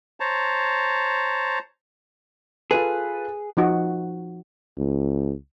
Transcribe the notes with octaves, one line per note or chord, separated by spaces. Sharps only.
C5 C#5 A5 A#5
F4 G#4 A4 B4
F3 D#4 F#4
C#2